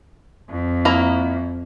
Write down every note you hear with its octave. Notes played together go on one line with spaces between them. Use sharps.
F2
A#3 E4 A#5